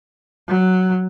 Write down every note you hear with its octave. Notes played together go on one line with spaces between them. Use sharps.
F#3